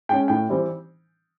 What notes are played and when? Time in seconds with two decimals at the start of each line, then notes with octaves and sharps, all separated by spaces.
0.09 G#3 C#4 G5
0.28 A2 G5
0.49 E3 G3 C4